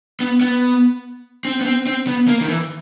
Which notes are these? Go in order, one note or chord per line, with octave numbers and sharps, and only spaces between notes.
B3
B3
C4
B3
C4
C4
B3
A#3
D#3
E3